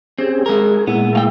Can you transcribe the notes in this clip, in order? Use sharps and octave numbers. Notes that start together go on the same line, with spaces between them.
C4 C#4 G4 G#4
G#3 G#4 A#4
A#2 G#3 B3 E4
A3 F5 G5